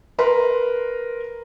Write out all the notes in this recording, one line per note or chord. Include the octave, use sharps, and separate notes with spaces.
A#4 B4 A#5 C6